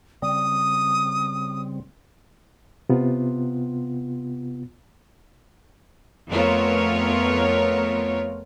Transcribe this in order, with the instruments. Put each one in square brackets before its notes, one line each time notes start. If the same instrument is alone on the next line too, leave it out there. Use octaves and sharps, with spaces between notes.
[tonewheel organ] C#3 G3 C4 [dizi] D#6
[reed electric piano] C3 B3 F4
[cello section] F2 A3 B3 F4 A#4 C#5